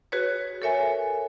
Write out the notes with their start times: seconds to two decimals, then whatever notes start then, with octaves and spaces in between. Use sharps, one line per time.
0.12 F#4 G#4 B4 C#5
0.62 A4 A#4 C#5 E5 G#5